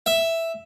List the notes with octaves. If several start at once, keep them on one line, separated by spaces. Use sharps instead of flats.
E5